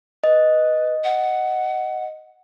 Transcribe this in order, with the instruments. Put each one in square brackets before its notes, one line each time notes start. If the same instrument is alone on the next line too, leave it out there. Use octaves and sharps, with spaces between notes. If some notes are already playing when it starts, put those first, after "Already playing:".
[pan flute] B4 [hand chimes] D#5
[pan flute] F#5